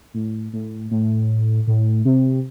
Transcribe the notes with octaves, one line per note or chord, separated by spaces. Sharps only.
A2
A2
A2
A2
C3